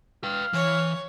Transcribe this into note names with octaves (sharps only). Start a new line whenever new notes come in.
B4 F5 G5
E3 C#5